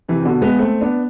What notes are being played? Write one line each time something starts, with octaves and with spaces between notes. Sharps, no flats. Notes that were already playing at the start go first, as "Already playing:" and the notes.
C3 E3
C3
B2 D3
G#3 B3
A3 C4
B3 D4